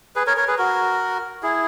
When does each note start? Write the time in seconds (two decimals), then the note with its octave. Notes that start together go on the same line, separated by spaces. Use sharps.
0.16 G#4 B4
0.27 A#4 C#5
0.37 A#4 C#5
0.48 G#4 B4
0.58 F#4 A#4
1.43 E4 G#4